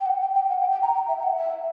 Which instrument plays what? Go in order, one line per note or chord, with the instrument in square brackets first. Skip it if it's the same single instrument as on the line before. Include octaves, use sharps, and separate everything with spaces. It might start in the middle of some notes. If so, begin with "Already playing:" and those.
[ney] G5
F#5
G5
G5
F#5
G5
G5
A#5
G5
E5
G5
F#5
E5